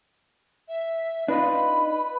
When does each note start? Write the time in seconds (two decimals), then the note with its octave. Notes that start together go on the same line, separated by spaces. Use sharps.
0.68 E5
1.28 D4 D#4 F4 B4 B5